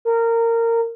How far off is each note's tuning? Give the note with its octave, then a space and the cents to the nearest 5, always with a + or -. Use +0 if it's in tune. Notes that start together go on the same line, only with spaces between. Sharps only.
A#4 -20